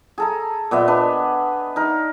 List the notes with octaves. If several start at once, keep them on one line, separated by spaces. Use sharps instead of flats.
G#4 A4 A#5
A#2 B3 D#5 E5
D4 B4
D#4 A#4